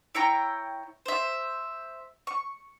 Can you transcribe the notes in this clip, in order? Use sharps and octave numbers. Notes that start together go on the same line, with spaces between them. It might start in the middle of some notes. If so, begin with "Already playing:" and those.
E4 C#5 G5 A#5
C5 E5
C#6